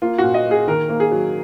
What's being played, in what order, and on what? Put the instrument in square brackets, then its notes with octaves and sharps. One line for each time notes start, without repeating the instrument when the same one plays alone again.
[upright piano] A#3 F4
A#2 F#4
D#5
A#3 G#4
D#3 A#4
A#3
G#4
F#3